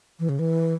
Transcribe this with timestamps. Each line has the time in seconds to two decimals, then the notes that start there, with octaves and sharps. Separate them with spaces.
0.19 E3
0.29 C#3
0.39 E3